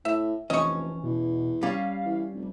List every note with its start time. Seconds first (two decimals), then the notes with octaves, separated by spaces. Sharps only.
0.05 A2 E5
0.50 F1 E3 C#4 D#5 C#6
1.04 E2 B2
1.63 G3 C#4 F5
2.05 E3
2.34 F1